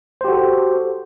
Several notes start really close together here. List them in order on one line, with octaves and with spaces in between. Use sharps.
C5 G4 F#4 A4